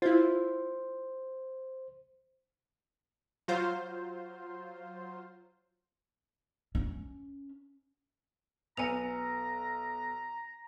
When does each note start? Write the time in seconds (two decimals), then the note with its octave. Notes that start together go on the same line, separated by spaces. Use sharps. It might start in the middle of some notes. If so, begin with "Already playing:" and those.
0.02 E4 F4 C5
3.48 F#3 F4 C5
6.75 C#4
8.77 B1 B4 G#5 A#5 C#7 F7